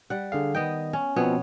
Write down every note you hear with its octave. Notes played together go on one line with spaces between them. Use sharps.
G3 F#5
D3 G#4 F5
D#3 B3 D#5 G5
C#4
B2 F3 B3 C4 C#5